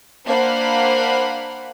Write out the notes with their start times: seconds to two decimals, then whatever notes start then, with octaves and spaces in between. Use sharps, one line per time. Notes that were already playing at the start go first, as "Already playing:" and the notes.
0.25 A#3 D4 C5 F5 F#5 B5